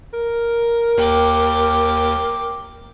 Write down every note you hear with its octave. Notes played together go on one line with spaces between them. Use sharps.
A#4
D#2 G5 D6